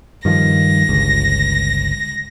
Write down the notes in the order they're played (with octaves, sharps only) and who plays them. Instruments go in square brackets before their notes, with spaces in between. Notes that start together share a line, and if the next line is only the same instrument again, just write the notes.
[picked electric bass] G2 D#3 F3 [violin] A#6
[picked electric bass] G1 C#2